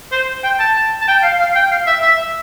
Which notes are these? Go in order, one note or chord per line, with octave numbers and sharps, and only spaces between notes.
C5
G5
A5
A5
G5
F5
F5
G5
F5
E5
E5